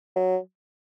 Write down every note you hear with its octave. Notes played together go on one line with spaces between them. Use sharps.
F#3